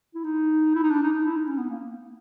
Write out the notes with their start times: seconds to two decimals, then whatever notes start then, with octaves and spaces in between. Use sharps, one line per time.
0.15 E4
0.24 D#4
0.75 E4
0.83 D#4
0.91 D4
1.03 D#4
1.13 D#4
1.25 E4
1.36 D#4
1.47 C#4
1.58 B3
1.70 A#3